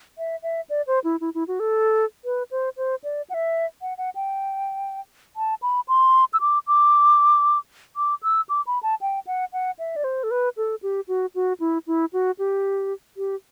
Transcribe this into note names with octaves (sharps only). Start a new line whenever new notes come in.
E5
E5
D5
C5
E4
E4
E4
F#4
A4
B4
C5
C5
D5
F#5
E5
F#5
F#5
G5
A5
B5
C6
E6
D6
D6
D6
E6
D6
B5
A5
G5
F#5
F#5
E5
D5
C5
A4
B4
A4
G4
F#4
F#4
E4
E4
F#4
G4
G4